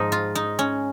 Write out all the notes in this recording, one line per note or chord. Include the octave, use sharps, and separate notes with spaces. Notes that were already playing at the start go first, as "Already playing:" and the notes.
Already playing: G#2 F3 D#4
F4
D#4
C#4